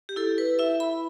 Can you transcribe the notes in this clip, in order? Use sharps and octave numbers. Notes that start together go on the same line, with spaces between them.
G4
E4 A4
B4
E4 E5
B5